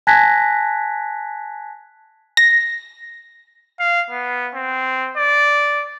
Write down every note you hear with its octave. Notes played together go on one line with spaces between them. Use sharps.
G#5 A5 F#6 G#6 A#6 B6
A#6
F5
B3
C4
D5